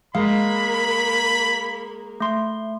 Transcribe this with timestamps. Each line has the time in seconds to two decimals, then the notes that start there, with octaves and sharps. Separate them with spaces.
0.15 G#3 A#3 F5 B5
2.20 A3 C6